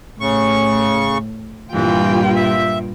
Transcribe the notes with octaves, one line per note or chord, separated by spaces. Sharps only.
A2 C#3 C#6
G2 A#2 E3 G3 F4 G5
E5